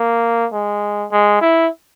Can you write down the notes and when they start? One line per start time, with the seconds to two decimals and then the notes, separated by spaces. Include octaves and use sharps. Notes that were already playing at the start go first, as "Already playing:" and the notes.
Already playing: A#3
0.53 G#3
1.12 G#3
1.41 E4